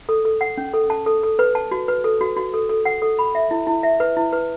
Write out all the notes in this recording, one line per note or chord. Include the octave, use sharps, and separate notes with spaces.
A4
A4
F#5
C#4
A4
A5
A4
A4
B4
A5
F#4
B4
A4
F#4
F#4
A4
A4
F#5
A4
B5
E5
E4
E4
E5
B4
E4
B4